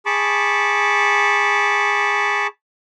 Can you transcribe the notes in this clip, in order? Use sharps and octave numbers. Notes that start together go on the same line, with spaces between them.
G#4 A5 B5 C#6 D6